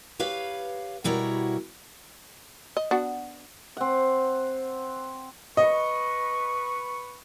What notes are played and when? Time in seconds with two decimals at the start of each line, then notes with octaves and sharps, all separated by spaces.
0.19 G4 B4 C#5 F5
1.04 B2 G3 E4 F#4 A#4 C#5
2.77 D#5
2.91 B3 D4 F#4
3.77 C4 F#5
5.57 B4 D#5 C#6